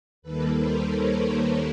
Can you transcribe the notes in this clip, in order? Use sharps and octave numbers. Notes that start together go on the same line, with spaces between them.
D#2 D#3 G3 A#3 A4 B4
A#4 C5
B4 C#5